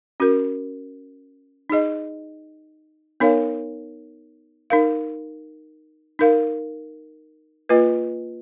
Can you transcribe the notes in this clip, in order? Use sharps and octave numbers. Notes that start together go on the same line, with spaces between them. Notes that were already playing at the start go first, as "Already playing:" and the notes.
C#4 F#4 A#4
D#4 G#4 D#5
B3 D#4 A#4 C#5 F5
D#4 A#4 F5
D#4 A#4 F5
A#3 F4 B4 D#5